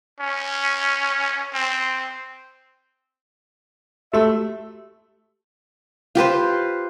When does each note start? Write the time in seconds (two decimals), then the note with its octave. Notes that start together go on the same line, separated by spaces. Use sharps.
0.20 C#4
1.54 C4
4.13 A3 F#4 G4 E5 C6
6.15 F4 G4 B4 C5